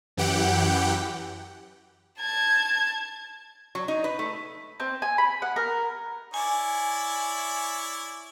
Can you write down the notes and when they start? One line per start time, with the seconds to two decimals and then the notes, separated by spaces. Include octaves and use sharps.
0.17 F#2 E3 G4 F#5 G5
2.20 A5 G#6
3.75 F#3
3.88 D#4
4.04 B4
4.19 A3
4.80 C4
5.02 G#5
5.18 B5
5.42 F#5
5.56 A#4
6.34 E4 C#5 D5 G#5